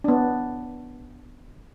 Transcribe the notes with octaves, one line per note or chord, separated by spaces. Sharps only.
B3 D4